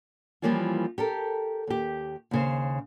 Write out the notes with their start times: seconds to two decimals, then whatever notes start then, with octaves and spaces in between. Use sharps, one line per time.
0.42 E3 F3 G3 A#3 C#4 F4
0.98 G4 A4 A#4
1.67 D#2 G4
2.31 D#2 C#3 C5